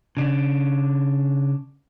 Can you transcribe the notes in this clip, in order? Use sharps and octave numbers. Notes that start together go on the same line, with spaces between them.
C#3 D4